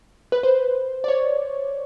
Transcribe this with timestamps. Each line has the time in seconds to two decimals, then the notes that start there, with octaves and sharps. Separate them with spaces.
0.32 B4
0.43 C5
1.04 D5
1.08 C#5